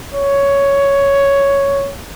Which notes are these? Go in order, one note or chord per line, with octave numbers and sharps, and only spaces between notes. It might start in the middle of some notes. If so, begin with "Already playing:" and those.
C#5